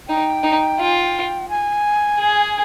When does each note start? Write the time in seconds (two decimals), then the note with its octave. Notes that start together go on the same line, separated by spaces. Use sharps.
0.08 D#4 G5
0.43 D#4
0.79 F4
1.49 G#5
2.19 G#4